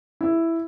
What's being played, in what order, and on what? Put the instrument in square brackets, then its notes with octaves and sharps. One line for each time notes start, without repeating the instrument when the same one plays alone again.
[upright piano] E4